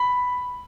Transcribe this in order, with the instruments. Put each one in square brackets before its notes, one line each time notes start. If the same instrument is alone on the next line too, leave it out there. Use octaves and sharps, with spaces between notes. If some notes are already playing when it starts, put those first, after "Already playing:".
Already playing: [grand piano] B5